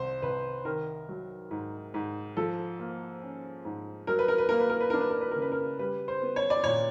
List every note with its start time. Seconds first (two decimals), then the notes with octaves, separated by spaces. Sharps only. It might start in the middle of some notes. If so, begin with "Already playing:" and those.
Already playing: C2 C5
0.22 C2 B4
0.65 D#3 A#4
1.09 F#3
1.51 G#2
1.94 G#2
2.37 F3 A4
2.79 A#3
3.22 C#4
3.65 G#2
4.07 F#3 A#4
4.19 B4
4.28 A#4
4.38 B4
4.49 A#3 A#4
4.59 B4
4.70 A#4
4.81 B4
4.90 D4 A#4
5.01 B4
5.10 A#4
5.21 B4
5.31 C#3 A#4
5.42 B4
5.52 A#4
5.79 G3 B4
6.08 C5
6.22 B3
6.36 C#5
6.50 D5
6.64 A#2 C#5